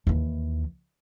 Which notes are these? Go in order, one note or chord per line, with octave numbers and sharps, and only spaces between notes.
D#2 E3